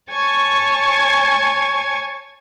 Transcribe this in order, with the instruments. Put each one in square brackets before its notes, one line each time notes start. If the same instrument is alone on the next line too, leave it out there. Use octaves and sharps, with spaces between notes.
[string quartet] C#5 G#5 A5 C#6